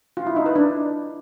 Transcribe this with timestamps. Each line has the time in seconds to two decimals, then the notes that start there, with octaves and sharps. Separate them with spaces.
0.17 F4
0.27 E4
0.36 D#4
0.46 B4
0.56 D4